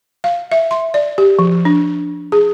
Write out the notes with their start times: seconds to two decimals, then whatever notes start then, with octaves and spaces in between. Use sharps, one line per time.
0.24 F5
0.52 E5
0.71 C6
0.94 D5
1.18 G4
1.39 F3
1.65 D4
2.32 G#4